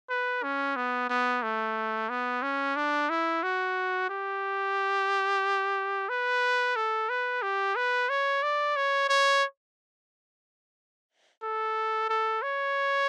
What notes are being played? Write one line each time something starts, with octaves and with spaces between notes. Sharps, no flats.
B4
C#4
B3
B3
A3
B3
C#4
D4
E4
F#4
G4
B4
A4
B4
G4
B4
C#5
D5
C#5
C#5
A4
A4
C#5